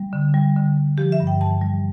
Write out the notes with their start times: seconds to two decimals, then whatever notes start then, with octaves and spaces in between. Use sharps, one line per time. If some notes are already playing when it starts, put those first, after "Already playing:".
Already playing: G3
0.13 D3
0.34 G3
0.56 D3
0.77 G3
0.98 F3 G4
1.12 E5
1.20 G2
1.27 G5
1.41 E3 A5
1.61 G3